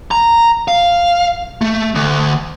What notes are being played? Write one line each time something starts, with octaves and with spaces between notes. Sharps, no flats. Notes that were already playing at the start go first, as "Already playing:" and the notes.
A#5
F5
A3
D2